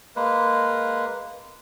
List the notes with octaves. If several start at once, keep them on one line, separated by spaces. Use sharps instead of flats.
G#3 A#3 B4